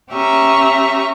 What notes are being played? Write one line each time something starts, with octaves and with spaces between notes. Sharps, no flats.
C#4 G4 E5 A#5 C#6